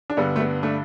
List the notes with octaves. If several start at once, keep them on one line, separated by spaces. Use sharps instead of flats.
D4
G2 D3 G3 B3
A3
B3
A3 D4